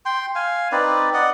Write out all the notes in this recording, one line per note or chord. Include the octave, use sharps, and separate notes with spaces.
G5 C6
F5 G#5
C4 D#4 B4 D5
D5 D#5 F#5